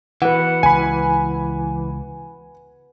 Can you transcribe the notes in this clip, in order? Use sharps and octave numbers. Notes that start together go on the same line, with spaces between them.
E3 B4 F#5
C#2 G#5 B5